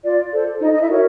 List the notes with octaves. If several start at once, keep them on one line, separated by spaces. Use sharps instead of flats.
F4 D5
A4 C5
D4 D#4 D#5
D#5
E4 E5
F#4 A#4 C#5